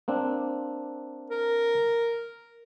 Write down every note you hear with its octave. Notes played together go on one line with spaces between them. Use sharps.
A#3 C4 D4
A#4